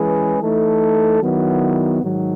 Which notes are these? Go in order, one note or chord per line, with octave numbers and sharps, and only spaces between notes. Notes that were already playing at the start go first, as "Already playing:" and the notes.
Already playing: E3 G#3 C#4 G#4 B4
E3 A3 D#4 A4
D#3 F#3 B3 E4
G#2 D#3 F#3